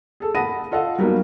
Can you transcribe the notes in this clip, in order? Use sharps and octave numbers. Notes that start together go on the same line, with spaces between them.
G#4 A4
F#5 A5 B5 D#6 A#6 D#7
F4 A4 D#5 F5 F#5
F#3 G3 A#3 B3 D#4